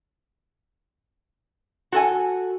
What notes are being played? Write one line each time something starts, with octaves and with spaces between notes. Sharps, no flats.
F#4 A4 G#5